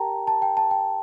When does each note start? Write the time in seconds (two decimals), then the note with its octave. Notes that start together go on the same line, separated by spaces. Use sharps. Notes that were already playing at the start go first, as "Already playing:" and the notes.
Already playing: G4 A#4 G5 A5 A#5
0.27 A5
0.42 G5
0.57 A5
0.71 G5